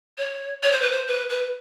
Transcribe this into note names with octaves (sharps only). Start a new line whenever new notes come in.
C#5
C#5
C5
B4
C5
B4
B4